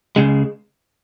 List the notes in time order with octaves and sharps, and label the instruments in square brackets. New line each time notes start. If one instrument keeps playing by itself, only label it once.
[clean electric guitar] C#2 C#3 G#3